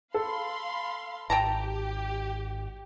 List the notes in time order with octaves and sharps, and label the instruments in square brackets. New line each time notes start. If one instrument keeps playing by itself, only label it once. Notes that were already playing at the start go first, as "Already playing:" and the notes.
[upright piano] A4 [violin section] F5 B5 C6
[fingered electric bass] G#1 [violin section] G4 [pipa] G5 A5 A#5